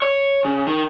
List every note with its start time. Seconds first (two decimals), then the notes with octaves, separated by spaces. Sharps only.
0.02 C#5
0.45 C#3
0.67 D#3